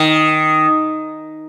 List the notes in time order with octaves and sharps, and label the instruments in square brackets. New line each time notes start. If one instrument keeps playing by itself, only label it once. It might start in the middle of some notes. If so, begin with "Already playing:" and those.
Already playing: [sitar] D#3